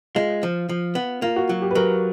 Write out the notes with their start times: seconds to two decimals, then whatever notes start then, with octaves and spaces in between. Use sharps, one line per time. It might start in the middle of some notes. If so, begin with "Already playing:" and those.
0.15 G#3 F4
0.43 F3
0.69 F3
0.95 B3
1.22 A#3 F4
1.36 F#4
1.49 F#3 F#4
1.62 G4
1.71 B4
1.75 F#3 A#4